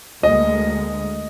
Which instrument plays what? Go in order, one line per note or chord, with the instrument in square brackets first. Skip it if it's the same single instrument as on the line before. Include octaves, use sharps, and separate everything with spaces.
[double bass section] D2 G#3 A#3 [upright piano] D#5